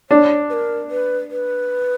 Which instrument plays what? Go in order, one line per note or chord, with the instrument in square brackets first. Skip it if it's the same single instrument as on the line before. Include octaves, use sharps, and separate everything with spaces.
[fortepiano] D4 [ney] C#5
[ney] B4
A#4
B4
B4